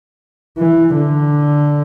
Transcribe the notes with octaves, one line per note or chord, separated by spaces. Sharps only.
E3
D3